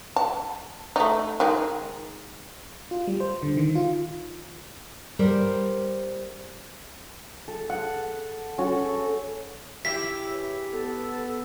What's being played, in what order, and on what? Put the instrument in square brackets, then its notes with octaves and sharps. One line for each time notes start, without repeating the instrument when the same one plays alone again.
[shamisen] A5
A3 D#4
D#3 G#3 G#4
[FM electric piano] F4
G3
C5
D3
D#3
F4
[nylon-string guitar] G3 A#4 C5
[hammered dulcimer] A4
F#5
C#4 F#4 A4
[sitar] E4 G4 E5 [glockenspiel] B6
[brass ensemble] E3 G#4 C#5
[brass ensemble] B3 [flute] A4